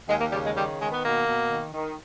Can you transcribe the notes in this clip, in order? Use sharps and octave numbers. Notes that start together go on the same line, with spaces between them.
D#2 G#3
A#3
C#3 G3
G#3
D#3 G3
D#3 G#3
B3
B2 A#3
B2
D#3
D#3